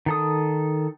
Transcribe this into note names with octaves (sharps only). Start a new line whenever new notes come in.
D#3 A4 D#6